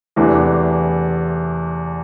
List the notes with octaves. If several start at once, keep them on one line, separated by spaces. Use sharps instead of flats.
E2 C3 E3 A3 D4